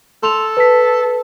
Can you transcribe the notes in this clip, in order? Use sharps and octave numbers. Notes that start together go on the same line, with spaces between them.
A4 C6 F7
B4 A5 B6